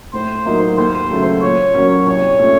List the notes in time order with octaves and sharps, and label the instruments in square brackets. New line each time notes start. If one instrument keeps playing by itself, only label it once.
[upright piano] A2 [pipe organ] C5
[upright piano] F#3 A#3 D#4
[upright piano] D#2 [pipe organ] C5
[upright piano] C#3 F#3 A3
[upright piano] A#2 [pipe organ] C#5
[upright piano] F#3 A#3 C#4
[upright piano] C2 [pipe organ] C#5
[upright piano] A#2 A3 C#4